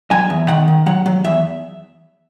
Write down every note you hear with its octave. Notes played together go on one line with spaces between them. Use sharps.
F#3 G#5
E2
D#3 F#5
D#3
F#3 F#5
F#3
E2 E5